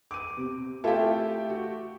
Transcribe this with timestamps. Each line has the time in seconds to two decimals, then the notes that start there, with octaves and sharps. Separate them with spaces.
0.11 D6 D#7
0.37 C3
0.84 A3 E4 F4 G4 A4
1.50 F#4